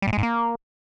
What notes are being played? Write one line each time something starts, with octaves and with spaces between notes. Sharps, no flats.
G3
A2
G#3
G#2
A#3